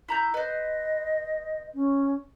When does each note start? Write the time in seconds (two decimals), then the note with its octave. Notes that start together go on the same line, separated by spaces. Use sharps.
0.08 E4 A#5 G6
0.34 B4 C5 D#5
1.74 C#4